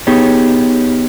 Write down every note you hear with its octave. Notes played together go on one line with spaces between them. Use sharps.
B3 D#4 G4 G#4 C#5